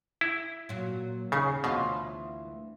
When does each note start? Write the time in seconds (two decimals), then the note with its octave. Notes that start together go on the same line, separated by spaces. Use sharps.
0.21 E4
0.69 A#2 F#3
1.32 D#2 C#3 C#4 G#4
1.64 D2 B2 E3 F4